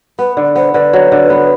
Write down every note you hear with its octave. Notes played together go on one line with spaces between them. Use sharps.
B3 B4
D3
B3 C5
D3 B4
F#3
D3
B3